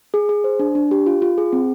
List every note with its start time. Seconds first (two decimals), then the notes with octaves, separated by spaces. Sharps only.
0.14 G#4
0.29 G#4
0.44 C5
0.59 D4
0.75 D4
0.91 G4
1.07 F4
1.22 F4
1.38 G#4
1.53 C4